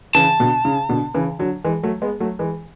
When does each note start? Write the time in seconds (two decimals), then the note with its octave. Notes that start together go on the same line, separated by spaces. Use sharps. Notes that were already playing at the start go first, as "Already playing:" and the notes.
0.15 C#3 E3 A5
0.39 B2 D3
0.65 C#3
0.89 B2 D3
1.15 C#3 E3
1.39 D3 F#3
1.64 E3 G#3
1.83 F#3 A3
2.02 G#3 B3
2.20 F#3 A3
2.39 E3 G#3